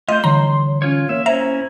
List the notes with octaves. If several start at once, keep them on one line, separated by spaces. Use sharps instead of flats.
A3 F4 C5 D#5
D3 E3 G3 C#5 A#5 C6
C#4 F4 C#5
A#3 C#5 E5
C#4 E4 C5 E5 A#5